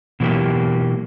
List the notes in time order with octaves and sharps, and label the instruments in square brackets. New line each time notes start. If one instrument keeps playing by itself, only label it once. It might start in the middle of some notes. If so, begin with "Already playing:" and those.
[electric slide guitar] B2 E3 F#3 G#3 A#3 G4